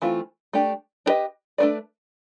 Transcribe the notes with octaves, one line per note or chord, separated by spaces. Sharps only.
E3 A3 C4 F4
A3 D4 G4
D4 G4 B4 D#5
A3 D4 F#4 B4 D5